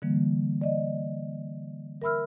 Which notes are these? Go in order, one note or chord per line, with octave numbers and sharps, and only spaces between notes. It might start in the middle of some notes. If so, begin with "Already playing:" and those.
D3 E3 G3 A#3
D5 D#5
A#4 E5 B5 E6 F6